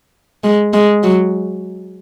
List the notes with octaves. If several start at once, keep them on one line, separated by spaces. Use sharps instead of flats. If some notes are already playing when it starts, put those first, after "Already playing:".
G#3
G#3
F#3